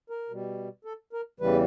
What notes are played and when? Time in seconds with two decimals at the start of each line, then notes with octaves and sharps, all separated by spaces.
0.10 A#4
0.29 B2 G3
0.85 A4
1.13 A#4
1.40 E2 C#3 E3 G3 B4